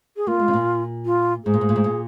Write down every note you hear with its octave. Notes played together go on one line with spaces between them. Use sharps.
G#4
A#3 F4
G#3
C#3
A#2
F4
G#2 G#4
A#2
G#2
A#2
G#2
A#2